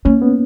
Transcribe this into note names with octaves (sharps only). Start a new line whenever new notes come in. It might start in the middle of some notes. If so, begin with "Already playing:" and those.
A#3 C#4
B3